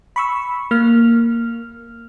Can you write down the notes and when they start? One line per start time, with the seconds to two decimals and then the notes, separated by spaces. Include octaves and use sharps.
0.16 B5 C#6 E6
0.71 A#3 F6